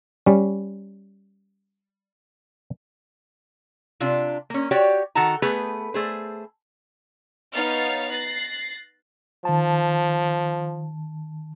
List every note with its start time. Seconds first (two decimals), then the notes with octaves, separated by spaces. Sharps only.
0.26 G3 C#4
4.00 C3 D4 F4
4.50 A#3 C#4
4.71 F#4 G4 C#5 D5 G5
5.15 D#3 F#4 A4 F#5 A5 A#5
5.42 A3 B3 G#4 B4
5.94 A3 G#4 C5
7.54 B3 D#4 C#5 F5 F6 A6
8.11 F#6 A6 A#6 C7
9.45 D#3 F3 A5